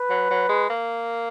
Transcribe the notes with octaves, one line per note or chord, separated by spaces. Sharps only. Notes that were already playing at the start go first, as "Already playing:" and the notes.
Already playing: B4
F#3
F#3
G#3
A#3